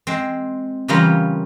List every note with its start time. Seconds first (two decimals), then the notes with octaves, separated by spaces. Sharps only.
0.07 G#3 C4
0.88 C#3 E3 G3 C#4 F4 A#4